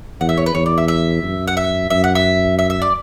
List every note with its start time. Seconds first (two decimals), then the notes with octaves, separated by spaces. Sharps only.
0.20 E2 F#5
0.29 E5
0.37 C#5
0.46 B4
0.54 E2 C#5
0.66 D5
0.78 E5
0.88 E5
1.23 F#2
1.48 F#5
1.57 E5
1.90 F#2 E5
2.04 F#5
2.15 E5
2.59 E5
2.70 E5
2.82 D5